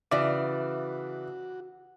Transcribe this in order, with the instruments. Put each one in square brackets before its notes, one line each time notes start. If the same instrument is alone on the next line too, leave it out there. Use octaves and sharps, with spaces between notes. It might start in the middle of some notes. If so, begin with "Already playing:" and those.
[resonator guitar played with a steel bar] C#3 E3 [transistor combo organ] F#4 [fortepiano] D5 [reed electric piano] E5